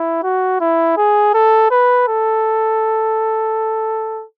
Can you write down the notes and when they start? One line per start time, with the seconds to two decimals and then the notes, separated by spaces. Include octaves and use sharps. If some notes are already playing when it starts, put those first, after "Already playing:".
Already playing: E4
0.23 F#4
0.60 E4
0.97 G#4
1.34 A4
1.71 B4
2.08 A4